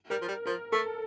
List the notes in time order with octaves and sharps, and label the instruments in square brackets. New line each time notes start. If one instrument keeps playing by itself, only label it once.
[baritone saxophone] G3 [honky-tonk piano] A#4
[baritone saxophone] F3
G3
[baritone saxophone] F3 [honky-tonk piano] A#4
[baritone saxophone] A3 [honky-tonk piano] A4